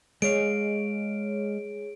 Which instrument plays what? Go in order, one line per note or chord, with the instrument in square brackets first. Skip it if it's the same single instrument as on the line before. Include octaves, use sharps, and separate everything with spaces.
[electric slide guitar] G#3 D#5 F5 [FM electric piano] G#4 C#5 [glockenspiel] D7